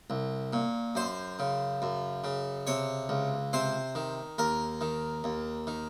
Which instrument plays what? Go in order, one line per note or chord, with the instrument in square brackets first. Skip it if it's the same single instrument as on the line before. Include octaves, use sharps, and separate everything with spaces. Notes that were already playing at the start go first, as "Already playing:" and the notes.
[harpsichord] C2
A#2
F#2 C5
C#3
F#2
C#3
C3 C#5
C#2
C3 C5
D#3
D#2 A#4
D#3
D#2
D#3